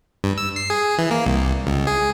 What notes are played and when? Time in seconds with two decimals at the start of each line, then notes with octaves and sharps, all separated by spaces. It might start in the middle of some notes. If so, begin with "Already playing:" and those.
0.24 G2
0.38 E6
0.56 C7
0.70 G#4
0.98 E3
1.11 A#3
1.26 C2
1.67 C#2
1.87 G#4